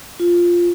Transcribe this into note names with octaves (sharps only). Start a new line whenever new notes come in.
F4